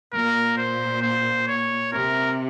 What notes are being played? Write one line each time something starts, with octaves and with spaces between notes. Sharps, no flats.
A#2 A#4
C5
C5
C#5
C3 A#4